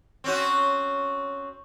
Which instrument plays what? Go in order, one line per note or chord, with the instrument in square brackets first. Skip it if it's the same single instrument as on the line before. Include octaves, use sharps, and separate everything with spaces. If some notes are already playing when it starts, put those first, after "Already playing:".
[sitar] C4 C#4 F#4